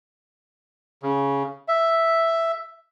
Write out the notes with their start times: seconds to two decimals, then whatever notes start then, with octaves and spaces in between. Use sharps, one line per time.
1.03 C#3
1.68 E5